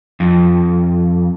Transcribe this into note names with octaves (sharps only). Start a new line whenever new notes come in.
F2